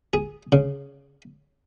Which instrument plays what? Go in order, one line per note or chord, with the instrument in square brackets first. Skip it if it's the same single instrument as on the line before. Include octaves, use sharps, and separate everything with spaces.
[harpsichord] G#4
C#3